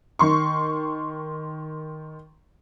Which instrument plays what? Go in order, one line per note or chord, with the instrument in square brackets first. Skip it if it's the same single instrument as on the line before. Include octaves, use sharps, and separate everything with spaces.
[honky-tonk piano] D#3 C6 C#6